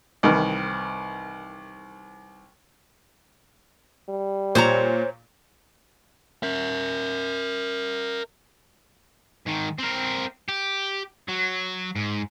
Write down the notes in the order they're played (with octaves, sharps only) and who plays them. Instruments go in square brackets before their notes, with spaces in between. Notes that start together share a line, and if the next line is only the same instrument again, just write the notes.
[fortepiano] C2 D#3 E3
[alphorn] G3
[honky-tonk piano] A#2 [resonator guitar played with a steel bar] C5 C#5 A#5
[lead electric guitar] A#4 E5
[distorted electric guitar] G#2 D#3
C4 A#4
G4
F#3
G#2